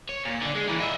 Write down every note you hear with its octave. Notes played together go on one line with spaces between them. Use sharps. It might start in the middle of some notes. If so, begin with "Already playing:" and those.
C#5
A#2
D3 D5
G#3
A#2 E3
D#5 E5